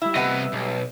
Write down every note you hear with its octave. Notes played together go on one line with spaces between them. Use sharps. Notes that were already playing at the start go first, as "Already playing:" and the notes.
G3 E4 E5
C3 B3 D#5 F#5
B1